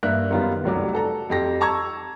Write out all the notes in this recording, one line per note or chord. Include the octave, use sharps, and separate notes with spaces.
G2 A#3 A#4 E5 F#6
F#2 D#3 G3 B3 F4
F1 C2 F#3 D5
F#4 A4 A#5
F2 G4 A#6
A5 A#5 C#6 E6 G#6